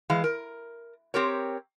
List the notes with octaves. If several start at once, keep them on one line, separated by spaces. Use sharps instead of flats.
E3 G#3 F5
A#4
C4 G4 A#4 C#5